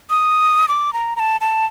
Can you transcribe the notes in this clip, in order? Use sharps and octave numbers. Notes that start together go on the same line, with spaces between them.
D#6
D6
A#5
A#5
A5
A5